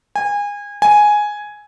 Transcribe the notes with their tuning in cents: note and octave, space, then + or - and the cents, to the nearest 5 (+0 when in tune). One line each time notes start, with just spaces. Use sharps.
G#5 -25
G#5 +5